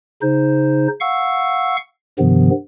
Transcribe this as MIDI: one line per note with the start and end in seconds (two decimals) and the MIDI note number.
0.22 0.88 49
0.22 0.88 63
0.22 0.88 72
1.00 1.77 77
1.00 1.77 78
1.00 1.77 85
1.00 1.77 88
2.19 2.50 43
2.19 2.50 48
2.19 2.50 51
2.19 2.50 53
2.19 2.50 59